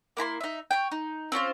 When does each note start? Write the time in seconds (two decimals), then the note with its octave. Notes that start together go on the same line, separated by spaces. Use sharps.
0.17 A#3 E4 A#5 C6
0.41 D#4 E5
0.71 C#5 G5
0.92 D#4
1.32 C4 C#4 F4 C5